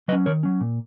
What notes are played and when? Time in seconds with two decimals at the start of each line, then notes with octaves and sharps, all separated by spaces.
0.08 F#3 B4 D#5
0.13 C#4
0.26 D#3 A#4 C#5
0.43 F#3 C#4
0.61 A#2